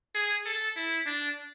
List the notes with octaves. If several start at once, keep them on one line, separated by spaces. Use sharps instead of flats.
G#4
A4
E4
D4